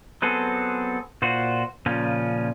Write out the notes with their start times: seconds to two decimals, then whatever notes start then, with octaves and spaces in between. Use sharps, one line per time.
0.22 F#3 B3 C4 G#4 A4
1.22 A#2 F4 F#4 C5
1.86 A#2 C#3 F3 C#4 F4